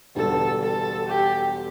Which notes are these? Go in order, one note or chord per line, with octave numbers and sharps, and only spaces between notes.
E1 E2 D3 G3 A4
A4
G4